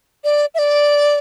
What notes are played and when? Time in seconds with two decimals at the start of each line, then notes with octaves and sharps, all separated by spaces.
0.24 D5
0.55 E5
0.59 D5